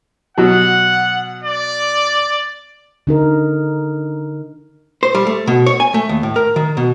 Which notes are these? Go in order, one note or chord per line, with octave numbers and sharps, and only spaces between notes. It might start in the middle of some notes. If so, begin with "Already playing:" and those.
B2 F#3 F#5
D5
D3 D#4 A#4
C5
G3
A3
B2
C#5
G#5
A3
D#2
A2
A#4
D#3
B2